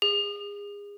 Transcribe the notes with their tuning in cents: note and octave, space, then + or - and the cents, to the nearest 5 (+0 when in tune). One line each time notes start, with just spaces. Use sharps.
G#4 -30